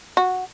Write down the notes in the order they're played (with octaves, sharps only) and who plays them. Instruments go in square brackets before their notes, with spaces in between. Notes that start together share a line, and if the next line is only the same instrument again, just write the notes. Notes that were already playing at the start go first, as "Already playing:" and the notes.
[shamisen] F#4